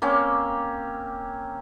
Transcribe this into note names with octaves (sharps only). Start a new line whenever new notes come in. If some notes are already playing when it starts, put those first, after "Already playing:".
A#3 C4 C#4 D6